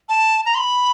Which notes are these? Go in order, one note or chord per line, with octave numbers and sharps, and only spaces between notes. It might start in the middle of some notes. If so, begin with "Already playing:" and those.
A5
A#5
C6
B5